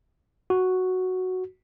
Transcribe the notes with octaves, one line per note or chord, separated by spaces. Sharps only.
F#4